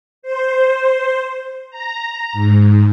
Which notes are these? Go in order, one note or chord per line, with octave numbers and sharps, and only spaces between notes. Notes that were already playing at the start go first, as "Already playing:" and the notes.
C5
A#5
G#2